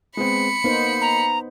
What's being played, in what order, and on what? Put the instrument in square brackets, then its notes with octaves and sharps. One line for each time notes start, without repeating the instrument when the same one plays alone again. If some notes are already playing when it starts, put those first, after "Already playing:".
[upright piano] G#3 B3 C4 [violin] B5 C#7
[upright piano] A#3 [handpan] B3 D#4 C5
[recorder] A#5